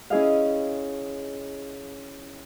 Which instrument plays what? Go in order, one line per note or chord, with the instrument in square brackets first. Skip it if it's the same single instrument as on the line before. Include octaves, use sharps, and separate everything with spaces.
[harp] C#4 E4 G#4 D#5 F5